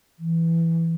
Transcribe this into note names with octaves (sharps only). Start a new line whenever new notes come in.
E3